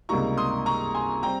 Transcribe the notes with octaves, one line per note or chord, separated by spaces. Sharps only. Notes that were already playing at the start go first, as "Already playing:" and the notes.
C#2 C3 G3 A#3 D#4 A#5 C#6
C6 D#6
A#5 C#6
G#5 C6
G3 C4 G5 A#5